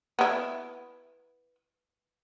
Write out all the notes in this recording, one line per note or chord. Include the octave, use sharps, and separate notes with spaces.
B3 E4